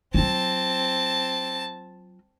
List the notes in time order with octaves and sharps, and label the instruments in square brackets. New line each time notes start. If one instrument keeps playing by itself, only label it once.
[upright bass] F#3 F4 [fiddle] C4 A5